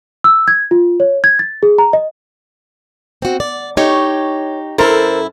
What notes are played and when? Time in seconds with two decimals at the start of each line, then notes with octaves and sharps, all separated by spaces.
0.24 E6
0.48 G#6
0.71 F4
1.00 C#5
1.24 G#6
1.39 A6
1.63 G#4
1.78 A#5
1.93 D#5
3.22 C4 F#4
3.40 D5
3.77 D#4 G4 C#5
4.78 F#2 E4 A4 A#4 C5